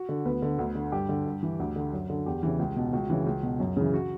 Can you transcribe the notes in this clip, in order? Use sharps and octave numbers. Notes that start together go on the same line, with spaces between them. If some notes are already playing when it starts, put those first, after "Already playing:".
Already playing: F#4
D3
D2 B3 B4
D3
D2
D3
G2 G4
D3
G2
E3
D2
D3
F#2 F#4
D3
E2 G4
C#3 E3
C#2
B2
C#2 F#4
C#3 E3
C#2
B2
F#2
C#3 E3
F#4